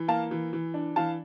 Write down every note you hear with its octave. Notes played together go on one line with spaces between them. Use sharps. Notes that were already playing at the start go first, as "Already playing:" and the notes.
Already playing: E3
A#3 F5 A5
E3
E3
D4
E3 F5 A5